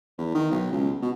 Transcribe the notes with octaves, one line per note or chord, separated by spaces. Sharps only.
E2
D#3
B1
C#2
B2